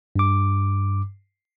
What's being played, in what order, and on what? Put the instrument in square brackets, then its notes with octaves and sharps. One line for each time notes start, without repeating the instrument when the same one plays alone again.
[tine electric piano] G2 D6